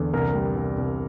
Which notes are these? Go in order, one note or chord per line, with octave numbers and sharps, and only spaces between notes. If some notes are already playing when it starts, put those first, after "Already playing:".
Already playing: E2 D3
C2 A#4
G3
C2
C2